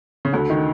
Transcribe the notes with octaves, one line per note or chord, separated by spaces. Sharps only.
C#3
D2 D3
D#3